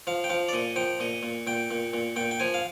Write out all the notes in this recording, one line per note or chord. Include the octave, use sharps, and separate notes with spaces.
F3 F5
G5
F3 F5
D5
A#2 D#5
F3 G5
A#2 D#5
A#2
A#2 G5
A#2
A#2
A#2 G5
G5
F3 G#5
F5